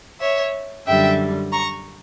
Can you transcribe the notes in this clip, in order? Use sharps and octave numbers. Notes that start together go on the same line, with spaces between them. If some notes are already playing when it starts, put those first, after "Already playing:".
C#5 E5
F#2 D3 G3 E5 G5
A#5 C#6